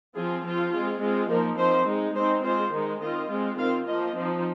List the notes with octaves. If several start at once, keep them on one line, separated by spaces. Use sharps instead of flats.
F3 C4 F4 G#4
F3 C4 F4
G#3 C4 F4 G#4
G#3 C4 F4
F3 A#3 D#4 A#4
F3 C4 D#4 C5
G#3 D#4
G#3 C4 D#4 C5
G#3 C4 F4 C5
D#3 G#3 D#4
D#3 C4 F4 D#5
G#3 C4 F4
D#3 C4 F4 F5
F3 A#3 F4 D#5
F3 C4 D#4